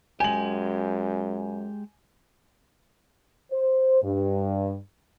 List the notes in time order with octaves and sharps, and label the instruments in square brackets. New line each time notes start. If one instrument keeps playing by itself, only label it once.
[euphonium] F#2 [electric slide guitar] G#3 G4 [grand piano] G#5 F#7
[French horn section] C5
G2